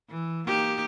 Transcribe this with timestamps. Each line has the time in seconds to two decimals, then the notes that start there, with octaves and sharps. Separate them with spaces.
0.10 E3
0.47 A#3 D#4 G4